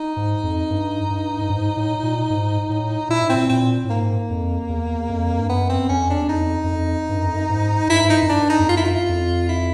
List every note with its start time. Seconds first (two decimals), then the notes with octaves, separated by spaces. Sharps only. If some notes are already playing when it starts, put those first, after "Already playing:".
Already playing: D#4
0.17 G#2
0.43 F2
0.70 G2
1.10 G2
1.41 G2
1.50 G#2
1.77 A2
2.03 A#2
2.30 G#2
2.69 A2
3.09 A#2 E4
3.22 A2
3.29 A#2 C4
3.49 A#2 C4
3.85 A2
3.89 G#2 A#3
4.30 F2
4.69 E2
5.09 F2
5.39 G2
5.49 F#2 B3
5.69 C4
5.89 F2 C#4
6.10 D4
6.16 E2
6.29 F2 D#4
6.64 F#2
6.69 F2
7.09 G2
7.18 F#2
7.27 F2
7.35 F#2
7.49 G#2
7.88 G2 E4
8.01 G#2
8.09 G2 D#4
8.23 F#2
8.29 G2 D4
8.49 D#4
8.59 F2
8.69 F#2 F4
8.77 E4
8.85 F4
9.09 F2
9.49 E4